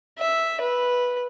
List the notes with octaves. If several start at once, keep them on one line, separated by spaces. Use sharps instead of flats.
E5
B4